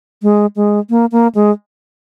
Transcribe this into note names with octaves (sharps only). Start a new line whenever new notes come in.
G#3
G#3
A#3
A#3
G#3